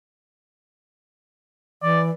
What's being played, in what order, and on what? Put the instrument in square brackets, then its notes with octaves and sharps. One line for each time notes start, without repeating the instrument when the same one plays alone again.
[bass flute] E3 [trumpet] D5